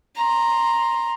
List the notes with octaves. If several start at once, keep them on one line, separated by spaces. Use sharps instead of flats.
A#5 C6